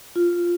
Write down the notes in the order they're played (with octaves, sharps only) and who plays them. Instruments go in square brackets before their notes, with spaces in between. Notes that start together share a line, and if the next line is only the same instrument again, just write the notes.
[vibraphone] F4